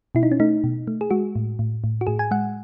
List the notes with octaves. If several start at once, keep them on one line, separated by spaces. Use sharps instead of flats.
B2 E4
D#4
C#4
A3 D#4
B2
A3
G#4
G#3 F#4
A2
A2
A2
F#4
A2 G#4
G#5
G#3 F#5